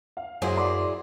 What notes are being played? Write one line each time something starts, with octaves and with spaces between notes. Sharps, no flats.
F5
F#2 F#3 E4 G#4 C5
D5 C6 D6